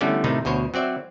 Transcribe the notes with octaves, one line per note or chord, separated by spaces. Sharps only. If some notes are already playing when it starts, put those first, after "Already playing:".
D3 E3 G3 A3 B3 C#4
A2 C3 D#3 A3 D#4
D2 B2 C5 C#5
F#3 C4 D5 E5